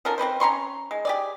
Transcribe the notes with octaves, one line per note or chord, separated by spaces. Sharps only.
F3 C#4 A4 A#4
C4 C#4 B4 C5
C#4 A#5 C6 C#6
G#3
G4 G#4 D5